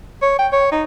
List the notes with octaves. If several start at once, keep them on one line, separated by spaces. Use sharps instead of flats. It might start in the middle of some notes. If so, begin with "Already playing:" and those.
C#5
G5
C#5
D#4